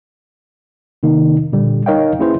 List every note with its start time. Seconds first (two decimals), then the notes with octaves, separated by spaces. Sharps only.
1.03 C3 D#3 A#3 D#4
1.53 A#2 D3 G3
1.86 D#4 A#4 C#5 D#5 F5 G5
2.19 A#3 C#4 E4 G#4 B4 C5